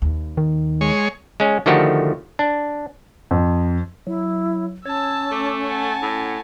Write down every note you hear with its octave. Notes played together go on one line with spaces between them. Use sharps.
D#2
D#3
G#3 C#5
G#3 C#4
D3 D#3 F3 A3 F#4 G4
D4
F2
F#3 E4
C#4 C#5 A5 E6
A3 D6
F#5 G#5 A5
A2